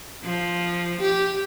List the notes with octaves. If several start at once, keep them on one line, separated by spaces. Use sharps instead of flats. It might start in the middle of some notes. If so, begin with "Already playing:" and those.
F3
G4